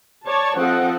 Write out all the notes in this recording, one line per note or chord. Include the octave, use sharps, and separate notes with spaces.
C#5 D5 A5
F3 C4 A4 D#5 F#5